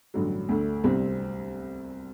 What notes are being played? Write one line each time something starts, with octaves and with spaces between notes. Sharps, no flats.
A1 G2 D3 F#3
D2 D3 A3
C2 C3 G3 C4